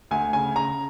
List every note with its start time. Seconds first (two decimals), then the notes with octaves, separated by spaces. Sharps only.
0.11 D2 G#5
0.33 C#3 G#5
0.56 C#3 A#5